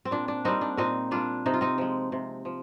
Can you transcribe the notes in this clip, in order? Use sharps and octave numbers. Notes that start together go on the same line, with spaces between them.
C4
A#2 D4
D4
G3 A#3 C4 D#4
D4
A#2 C4 D#4
G3 A#3 D4 F4
C3 D#4
F4
C4 D#4
F3 G#3
C3
F3